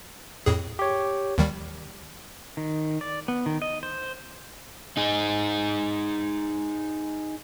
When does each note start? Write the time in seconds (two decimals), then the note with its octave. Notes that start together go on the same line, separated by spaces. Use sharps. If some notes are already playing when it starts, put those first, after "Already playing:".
0.46 F2 A2 G#4
0.79 G4 C#5
1.38 D#2 D#3 G3
2.57 D#3
3.01 D5
3.28 B3
3.46 D#3
3.62 D#5
3.83 C5
4.97 D#4 G#4